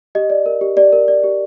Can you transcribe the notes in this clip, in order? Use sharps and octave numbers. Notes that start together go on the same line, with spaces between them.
G4 D#5
D5
A#4
G4
G4 D5
A#4
D5
G4